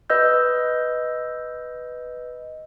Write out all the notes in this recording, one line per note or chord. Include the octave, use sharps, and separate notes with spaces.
B4 D#5 E6 G6